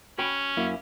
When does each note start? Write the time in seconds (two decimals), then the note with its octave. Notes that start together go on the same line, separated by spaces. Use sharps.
0.18 C#4 F#4 G5 B5
0.57 F#2 A#3 E4